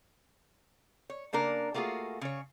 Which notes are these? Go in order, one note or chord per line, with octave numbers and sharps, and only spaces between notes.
C#5
C#3 A#3 D4 A#4
A3 A#3 F4 F#4 G#4
C#3 C#5